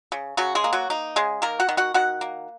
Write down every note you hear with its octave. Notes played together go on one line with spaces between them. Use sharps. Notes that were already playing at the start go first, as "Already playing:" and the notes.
C#3
C#3 F#3 F#4
G#3 G#4
A#3
F#3 F#4
A#3 D#4
C#3 G#3 G#4
D#3 A#3 A#4
F#4 F#5
D#3
F#4 F#5
D#3 F#4 F#5
A#3